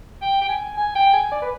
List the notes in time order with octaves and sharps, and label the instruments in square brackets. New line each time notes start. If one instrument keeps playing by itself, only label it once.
[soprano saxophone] G5
G5
G#5
G#5
G5
G#5
D5
B4